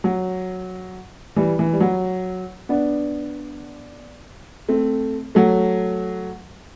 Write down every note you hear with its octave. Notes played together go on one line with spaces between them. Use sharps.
F#3
E3 G3
E3
G3
F#3
B3 D4
A3 C4
F#3 A3